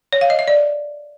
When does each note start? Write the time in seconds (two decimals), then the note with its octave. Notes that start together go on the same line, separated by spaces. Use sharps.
0.13 C#5
0.21 F5
0.30 D#5
0.39 E5
0.48 D5